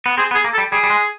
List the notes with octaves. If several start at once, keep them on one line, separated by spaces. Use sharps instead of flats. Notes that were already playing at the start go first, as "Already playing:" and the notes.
B3
C4 G#4
B3
G#4
A#3
A4
G3
G3 G#4
G3
G#3